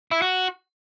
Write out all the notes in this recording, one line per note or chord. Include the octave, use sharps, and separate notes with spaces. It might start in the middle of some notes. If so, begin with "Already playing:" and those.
E4
F#4